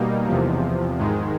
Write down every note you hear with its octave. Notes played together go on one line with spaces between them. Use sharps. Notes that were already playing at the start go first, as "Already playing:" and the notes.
Already playing: B2 G3 A#3 D#4
E2 C3 F3
G#2 D#3 G#3